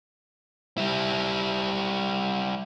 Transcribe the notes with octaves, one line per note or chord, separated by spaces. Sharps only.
G3 E4